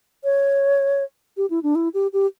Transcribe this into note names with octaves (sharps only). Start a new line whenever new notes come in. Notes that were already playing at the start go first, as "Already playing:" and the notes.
C#5
G4
E4
D4
E4
G4
G4